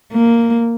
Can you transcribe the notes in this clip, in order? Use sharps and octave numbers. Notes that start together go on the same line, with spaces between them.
A#3